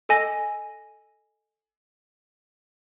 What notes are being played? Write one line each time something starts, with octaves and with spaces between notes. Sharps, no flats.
A4 D#5 G#5 A#6